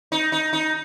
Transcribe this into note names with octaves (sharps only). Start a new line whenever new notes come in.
D#4
D#4
D#4